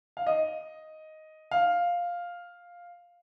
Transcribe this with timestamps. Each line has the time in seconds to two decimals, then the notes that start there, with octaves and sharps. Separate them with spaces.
0.17 F5
0.27 D#5
1.51 F5